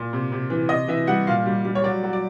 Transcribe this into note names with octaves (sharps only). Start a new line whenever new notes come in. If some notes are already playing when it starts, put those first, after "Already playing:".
Already playing: A#2
C3
C3
E3
C3 D#5
E3 E5
G3 F#5
A#2 F5
G3
G3
C#5
F#3 D5
F#3
D5